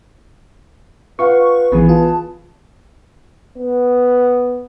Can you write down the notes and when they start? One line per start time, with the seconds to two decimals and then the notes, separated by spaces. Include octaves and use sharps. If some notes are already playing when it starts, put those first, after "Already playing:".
1.19 F4 B4 F5 F#5 C#6
1.72 A#1 E3 B3 G#4
1.89 F4 A5
3.57 B3